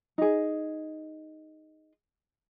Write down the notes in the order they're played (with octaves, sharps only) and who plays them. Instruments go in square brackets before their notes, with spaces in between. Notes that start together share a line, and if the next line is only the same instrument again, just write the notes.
[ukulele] D#4 G#4